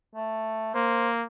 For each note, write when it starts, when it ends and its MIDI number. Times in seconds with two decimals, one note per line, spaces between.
0.16 0.72 57
0.74 1.25 58
0.74 1.09 72